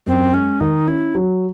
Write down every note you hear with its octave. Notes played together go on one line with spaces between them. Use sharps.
F#2 C4
G#3 C#4
D#3 D#4
C#4 E4
F#3